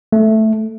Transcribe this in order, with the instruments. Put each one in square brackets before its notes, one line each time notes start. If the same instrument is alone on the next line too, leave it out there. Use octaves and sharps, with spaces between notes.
[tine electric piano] A3